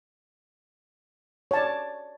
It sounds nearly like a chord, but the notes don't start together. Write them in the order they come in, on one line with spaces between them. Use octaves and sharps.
C#5 A5 D5